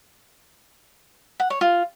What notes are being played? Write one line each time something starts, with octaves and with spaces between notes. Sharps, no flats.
F#5
C#5
F4